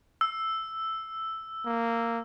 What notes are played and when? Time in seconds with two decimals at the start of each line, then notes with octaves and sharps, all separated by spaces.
0.21 E6
1.66 A#3